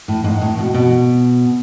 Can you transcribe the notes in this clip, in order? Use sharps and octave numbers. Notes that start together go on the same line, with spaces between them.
A2
G#2
A2
B2
B2